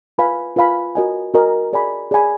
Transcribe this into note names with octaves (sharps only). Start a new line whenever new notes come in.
F4 B4 F5 G#5 B5
F4 B4 F5 G#5 B5
F#4 A#4 D#5 G#5
F#4 A#4 D#5 G#5
G#4 D5 G#5 B5
G#4 D5 G#5 B5